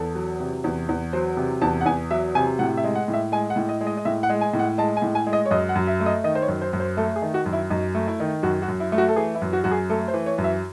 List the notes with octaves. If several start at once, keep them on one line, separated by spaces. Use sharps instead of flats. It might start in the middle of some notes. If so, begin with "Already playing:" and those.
Already playing: E2 A4
F#3
C3
E2
E2
F#3 C5
C3
E2 A5
F#5
E2 G#5
F#3 E5
C3 G#5
A2 F#5
E5
G#3
F#5
A2
E5
G#3 G#5
F#5
A2
D#5
G#3
D#5
D#5
A2 E5
F#5
G#3
G#5
A2
F#5
G#3 A5
G#5
A2
G#5
G#3
D#5
C#5
F#2 D#5
F#5
F#2
E5
A3
D#5
D#3 D#5
C5
C#5
F#2
C5
F#2
C5
A3 A4
G#4
D#3
F#4
F#2
E4
F#2 D#4
A3
E4
D#3
F#2 F#4
F#4
F#2
E4
A3
F#4
A4
E3 G#4
E4
F#2
F#4
F#2 F#4
G#4
A3 A4
C5
E3
C#5
F#2
E5